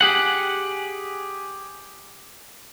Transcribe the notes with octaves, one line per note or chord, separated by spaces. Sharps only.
G4 G#4 F#5